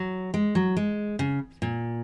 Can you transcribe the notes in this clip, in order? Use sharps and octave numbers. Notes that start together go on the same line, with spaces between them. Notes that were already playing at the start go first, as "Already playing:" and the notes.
Already playing: F#3
G#3
F#3
G#3
C#3
A#2